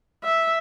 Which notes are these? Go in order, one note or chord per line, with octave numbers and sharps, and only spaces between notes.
E5